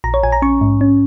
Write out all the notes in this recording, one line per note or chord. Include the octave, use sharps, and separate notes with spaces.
A#1 A#5
C#5
A#1 G#5
A#5
C#4 C#6
G#2
C#4